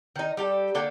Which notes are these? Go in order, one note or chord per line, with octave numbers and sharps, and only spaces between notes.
D#3 D#4
G3 G4 A4
D3 A#3 A4 G5